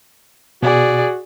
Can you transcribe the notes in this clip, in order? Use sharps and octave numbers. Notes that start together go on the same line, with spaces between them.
B2 F#4 G#4 D5